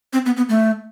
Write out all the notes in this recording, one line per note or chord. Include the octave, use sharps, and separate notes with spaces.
C4
B3
B3
A3